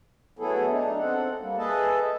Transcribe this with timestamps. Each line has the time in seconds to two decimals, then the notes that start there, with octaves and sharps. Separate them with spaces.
0.39 F#3 A3 B3 E4 G#4 A4
0.71 D4 D#4
0.99 C4 A4 F#5
1.40 G3 A#3
1.58 G#4 A4 B4 D#5 E5 A5